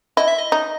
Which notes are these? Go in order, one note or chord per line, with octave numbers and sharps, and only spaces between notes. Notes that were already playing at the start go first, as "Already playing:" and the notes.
E4 D#5
E5
D#5
D#4